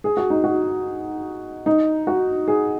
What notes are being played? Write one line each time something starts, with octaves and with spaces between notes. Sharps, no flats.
G#4
F#4
D#4
F#4
D#4
F#4
G#4